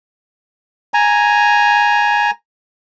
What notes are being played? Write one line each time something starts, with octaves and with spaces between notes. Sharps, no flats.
G#5 A#5